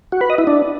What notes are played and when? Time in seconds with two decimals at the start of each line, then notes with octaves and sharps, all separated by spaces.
0.12 F#4
0.21 B4
0.30 D#5
0.38 E4
0.47 D4